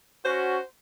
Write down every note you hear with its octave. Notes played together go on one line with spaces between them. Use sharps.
C#4 F#4 C5